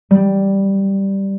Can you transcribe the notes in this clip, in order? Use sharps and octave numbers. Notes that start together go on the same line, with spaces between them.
G3